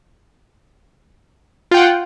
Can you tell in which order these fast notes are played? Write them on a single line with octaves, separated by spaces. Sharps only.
F4 G5 F#5